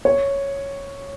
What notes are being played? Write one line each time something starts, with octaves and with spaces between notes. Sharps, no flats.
C#5